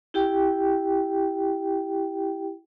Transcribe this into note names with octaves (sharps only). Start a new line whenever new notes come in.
E4 G4 G5